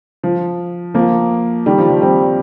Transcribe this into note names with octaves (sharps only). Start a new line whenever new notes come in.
F3
F3 A#3
D#3 G3
F3
F3
G3 C4